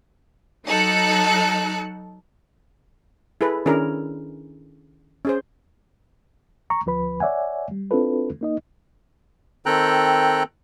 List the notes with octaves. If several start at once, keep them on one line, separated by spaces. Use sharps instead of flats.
F#3 D#4 A4 F#6 C#7
E4 G#4 A4 B4
D#3 C#4 D4 E4 G#4 A#4
C#4 G#4 C5
A#5 C#6
D2 F3 B4 B5
C#5 D5 E5 F#5 G#5
G3
C4 D4 E4 F4 A4 B4
A#3 D#4 D#5
D#3 C4 A4 G5 A#5 F#6